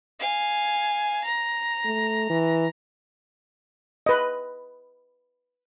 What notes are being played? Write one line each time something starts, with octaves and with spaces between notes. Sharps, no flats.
F5 G#5
A#5
A3
E3
B4 D#5